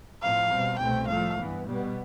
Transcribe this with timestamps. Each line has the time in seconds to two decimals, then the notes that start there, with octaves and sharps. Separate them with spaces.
0.22 A2 F3 C4 F5
0.51 B2 G3 C4
0.79 C2 B2 A3 C4 G5
1.08 A2 F3 A3 F5
1.36 G2 E3 B3
1.65 B2 G3 B3